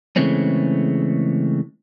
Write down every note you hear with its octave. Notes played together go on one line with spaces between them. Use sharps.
C#3 E3 G#3 A3 C4 C#4